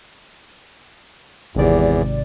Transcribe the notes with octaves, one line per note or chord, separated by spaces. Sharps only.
G#1 E2 C3 D5